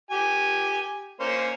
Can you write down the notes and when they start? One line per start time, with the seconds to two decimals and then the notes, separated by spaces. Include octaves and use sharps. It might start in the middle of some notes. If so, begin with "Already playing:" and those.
0.11 G4 G#5
1.20 A#3 C#4 C5